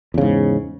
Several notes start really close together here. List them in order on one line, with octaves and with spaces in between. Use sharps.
E2 C#3 G#2